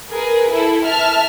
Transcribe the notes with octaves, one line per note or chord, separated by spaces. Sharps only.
G#4 A#4 B4
E4 A4
E5 A5 F6